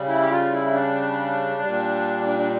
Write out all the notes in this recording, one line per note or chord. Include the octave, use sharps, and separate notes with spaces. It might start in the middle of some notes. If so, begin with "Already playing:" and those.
Already playing: C#3 G3
E4
G4
F4
E4
D4
A#2 G3
D4
D4